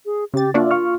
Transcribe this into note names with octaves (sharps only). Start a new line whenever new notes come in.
G#4
C#3 G4 A6
A#3 D4 F4 F#4 D5 E5
F5 C#6 F6